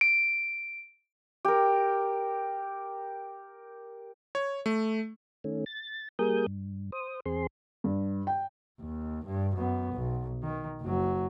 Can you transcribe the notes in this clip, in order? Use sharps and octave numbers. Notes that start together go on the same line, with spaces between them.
D7
G4 A#4
C#5
A3
D#3 A3 C#4
A6
G3 A#3 G#4 A#4 D#6 G6
G2
C5 D#6
E2 C4 G#4 C6
G2
G5
D#2
G2
F#2 B3
B1
D#3
F#1 F#3